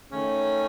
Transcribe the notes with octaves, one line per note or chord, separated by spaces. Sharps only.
D#3 A3 C#4